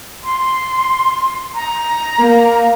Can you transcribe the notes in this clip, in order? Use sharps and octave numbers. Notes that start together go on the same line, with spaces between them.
C6
A#5
A#3